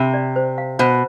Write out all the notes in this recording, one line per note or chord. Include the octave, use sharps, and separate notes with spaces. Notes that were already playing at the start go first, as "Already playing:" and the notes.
Already playing: C3 B5
D5
C5
F5
B2 C5